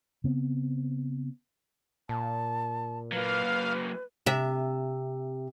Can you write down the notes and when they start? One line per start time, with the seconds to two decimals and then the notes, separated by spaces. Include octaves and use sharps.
0.24 C#3 B3 C4
2.09 A#2 A5
3.12 F#3 A#3 B4 F5
4.26 C3 E5